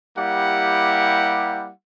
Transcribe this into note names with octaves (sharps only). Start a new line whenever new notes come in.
G3 A#3 E4 G4 F#5